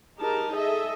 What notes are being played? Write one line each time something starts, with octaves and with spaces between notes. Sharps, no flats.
D#4 G4 G#4 A#4 A5
G#4 A4 D#5 E5